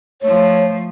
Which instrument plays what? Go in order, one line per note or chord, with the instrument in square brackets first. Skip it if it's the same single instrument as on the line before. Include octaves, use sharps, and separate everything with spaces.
[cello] F3 A3 [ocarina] C#5